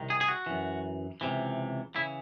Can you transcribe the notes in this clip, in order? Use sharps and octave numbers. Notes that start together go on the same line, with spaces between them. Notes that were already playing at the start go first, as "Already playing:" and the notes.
Already playing: C2 C3 D#3
G#4
G#4
F#4
F#2 E3
C#2 C3 E3
C#3 E3 E4